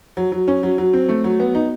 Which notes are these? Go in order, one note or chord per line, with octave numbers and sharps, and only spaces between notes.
F#3
F#3
C#4
F#3
F#3
C4
A3
F#3
B3
D#4